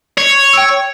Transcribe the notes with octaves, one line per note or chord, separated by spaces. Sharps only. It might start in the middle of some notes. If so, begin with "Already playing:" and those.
C#5
G5 C#6 E6